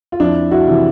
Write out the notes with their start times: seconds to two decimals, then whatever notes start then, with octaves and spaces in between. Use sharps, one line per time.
0.12 F4
0.20 F2 D4 E4
0.51 E4 F#4
0.67 C3 E3